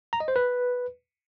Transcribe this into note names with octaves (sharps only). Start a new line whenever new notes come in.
A#5
D#5
C5
B4